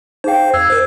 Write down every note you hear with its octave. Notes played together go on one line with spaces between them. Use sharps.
D#4 G#4 C5 F5 G5
F2 E6 G#6 C7
A#4 C5